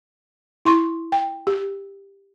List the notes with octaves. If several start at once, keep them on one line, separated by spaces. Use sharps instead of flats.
E4 C6 C#6
G5
G4